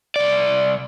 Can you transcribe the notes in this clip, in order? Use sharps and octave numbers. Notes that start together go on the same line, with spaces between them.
C2 D5